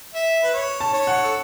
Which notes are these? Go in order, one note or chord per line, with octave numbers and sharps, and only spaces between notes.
E5
B4
C#5
A5
C#5
F#5
A4